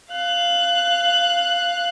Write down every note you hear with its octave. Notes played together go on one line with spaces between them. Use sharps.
F5 F#6